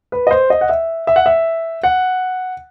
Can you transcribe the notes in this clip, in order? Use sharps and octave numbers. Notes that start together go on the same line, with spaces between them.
B4
D#5
C5
D#5
F#5
E5
E5
F#5
E5
F#5